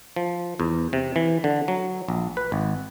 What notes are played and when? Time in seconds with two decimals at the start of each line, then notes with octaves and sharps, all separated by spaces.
0.16 F3
0.60 E2
0.93 C3
1.16 E3
1.44 D3
1.68 F#3
2.08 A#1
2.37 B4
2.52 G#1